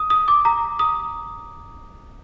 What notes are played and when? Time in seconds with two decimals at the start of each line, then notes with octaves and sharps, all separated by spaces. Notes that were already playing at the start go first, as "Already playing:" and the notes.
Already playing: D#6
0.10 D#6
0.28 D6
0.45 A#5
0.79 D#6